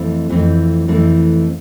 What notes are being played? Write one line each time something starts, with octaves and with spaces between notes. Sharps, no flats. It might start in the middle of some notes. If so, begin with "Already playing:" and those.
Already playing: F2 E3 A3 C4
F2 E3 A3 C4
F2 E3 A3 C4